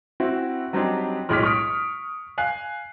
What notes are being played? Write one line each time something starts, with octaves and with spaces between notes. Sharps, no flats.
C4 E4 F#4
F#3 G3 C4 D4 D#4 G4
B1 A2 G#3 D6 F6 B6
C#6 D#6 F6 B6 D7
F5 G#5 F#6 C7